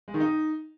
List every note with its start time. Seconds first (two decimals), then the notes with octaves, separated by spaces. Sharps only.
0.08 G#3
0.14 D#3
0.20 D#4